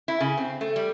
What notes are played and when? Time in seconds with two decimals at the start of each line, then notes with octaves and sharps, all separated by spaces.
0.08 E4
0.20 C#3
0.37 C4
0.61 A3
0.76 G3